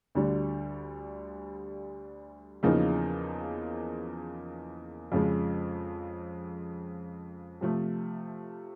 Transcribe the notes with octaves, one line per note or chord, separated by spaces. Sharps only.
D2 D3 G3
E2 C#3 F3 A#3 D#4
F2 C#3 F3 G#3
C3 F3 A3